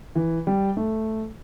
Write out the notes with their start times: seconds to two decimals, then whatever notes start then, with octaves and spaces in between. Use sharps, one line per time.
0.15 E3
0.47 G3
0.77 A3